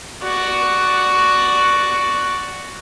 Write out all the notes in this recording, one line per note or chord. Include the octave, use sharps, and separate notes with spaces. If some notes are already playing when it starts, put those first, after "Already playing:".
F#4 D5